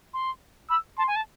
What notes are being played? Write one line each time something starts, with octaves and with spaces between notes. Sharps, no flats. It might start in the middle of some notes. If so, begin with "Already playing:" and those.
C6
B5 E6
A5 C6
G#5
A5